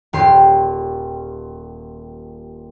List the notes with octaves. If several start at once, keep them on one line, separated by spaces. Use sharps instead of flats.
D#1 G4 C6